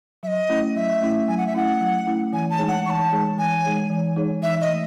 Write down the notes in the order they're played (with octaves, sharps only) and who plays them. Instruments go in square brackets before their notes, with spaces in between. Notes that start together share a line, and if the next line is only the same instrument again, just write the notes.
[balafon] F#3 [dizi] E5
[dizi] D#5
[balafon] A3 C#4 E4
[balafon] F#3 [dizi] E5
[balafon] A3 C#4 E4
[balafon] F#3 [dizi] G#5
[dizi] F#5
E5
[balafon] A3 C#4 E4 [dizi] F#5
[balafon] F#3
A3 C#4 E4
[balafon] E3 [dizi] G#5
[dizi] A5
[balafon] G#3 D#4 G#4 C#5
[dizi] F#5
[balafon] E3 [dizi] A5 C#6
[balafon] G#3 D#4 G#4 C#5
[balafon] E3 [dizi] G#5
[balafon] G#3 D#4 G#4 C#5
E3
G#3 D#4 G#4 C#5
[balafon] E3 [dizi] E5
[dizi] D#5
[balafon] A3